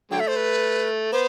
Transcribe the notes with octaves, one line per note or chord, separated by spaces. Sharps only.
D3 F#3 A3 G5
E5
C5
B4
B3 C5